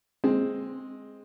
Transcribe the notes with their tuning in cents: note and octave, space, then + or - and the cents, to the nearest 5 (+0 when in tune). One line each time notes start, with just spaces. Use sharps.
G#3 +0 C4 +5